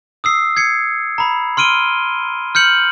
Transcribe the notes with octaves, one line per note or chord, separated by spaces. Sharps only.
D#6 E6 C7
G#6 C7 C#7
A#5 B5
C6 F6 D7 D#7 G7
F6 G6 C#7 F#7